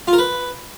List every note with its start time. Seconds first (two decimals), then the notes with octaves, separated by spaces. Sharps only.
0.08 F4
0.13 A#4
0.18 B4